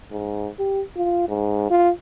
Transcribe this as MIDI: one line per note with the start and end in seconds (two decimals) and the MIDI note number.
0.12 0.48 44
0.59 0.82 67
0.96 1.25 65
1.28 1.70 44
1.70 1.90 65